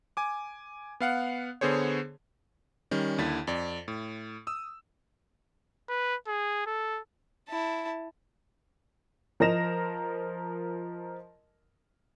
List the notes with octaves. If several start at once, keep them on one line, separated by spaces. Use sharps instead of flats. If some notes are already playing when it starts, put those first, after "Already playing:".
G#5 D6
B3 F5 F#5
D3 B3 G#4 C5 C#5
D#3 G3 C#4
D#2 D3 E4 A6 B6
F2 D5
A2
D#6 E6
B4
G#4
A4
E4 A5
F3 A#4 D#5 A#6 E7 F7